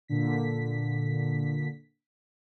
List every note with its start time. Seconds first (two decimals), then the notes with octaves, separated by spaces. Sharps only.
0.08 A#2 D3 B6